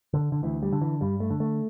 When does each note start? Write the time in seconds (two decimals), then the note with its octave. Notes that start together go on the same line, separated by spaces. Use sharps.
0.13 D3
0.32 D3
0.43 D2 E3
0.63 G3
0.73 D3
0.82 E3
1.01 G2 G3
1.20 A3
1.30 D3
1.40 A3